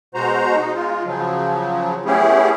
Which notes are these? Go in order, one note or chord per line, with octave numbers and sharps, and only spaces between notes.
B2 G#3 F#4 C5 A#5
D#4
G#3 F4
C#3 F3 F#3
A3 B3 C#4 E4 G4 G#4